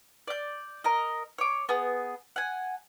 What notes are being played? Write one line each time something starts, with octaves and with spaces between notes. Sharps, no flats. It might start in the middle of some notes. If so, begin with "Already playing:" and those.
D5 G6
A#4 D#5
C#5 D6
B3 G#4
F#5 G#5